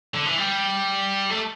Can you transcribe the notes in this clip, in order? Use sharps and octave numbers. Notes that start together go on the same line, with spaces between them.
D3
E3
G3
A3